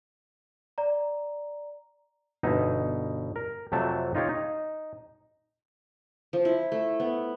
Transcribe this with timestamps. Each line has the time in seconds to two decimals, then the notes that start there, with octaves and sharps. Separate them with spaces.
0.78 D5 A#5
2.43 G1 B2 D#4 E5
3.36 A#4
3.72 F2 C3 F#3 A3 A5
4.15 D#4 F4 G4 C#5
4.29 D#4
6.33 F3
6.45 E4
6.72 A3
7.00 B3